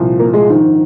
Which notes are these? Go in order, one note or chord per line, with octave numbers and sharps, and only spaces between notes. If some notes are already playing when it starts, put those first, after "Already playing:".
Already playing: C2 A#2 F3
A#3 A#4
G#3 G#4
A#1 G#2 D#3